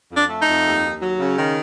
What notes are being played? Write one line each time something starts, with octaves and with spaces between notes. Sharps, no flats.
F2
D4
A3
D#4
F2
D#2
D#2
F#3
C#3
D#3